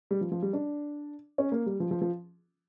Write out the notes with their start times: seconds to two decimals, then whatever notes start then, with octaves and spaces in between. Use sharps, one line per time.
0.11 G3
0.21 F3
0.32 F3
0.42 G3
0.53 D4
1.38 C#4
1.52 A#3
1.66 G3
1.80 F3
1.91 F3
2.01 F3